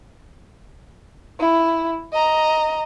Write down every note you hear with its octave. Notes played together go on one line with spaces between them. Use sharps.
E4
D#5 A#5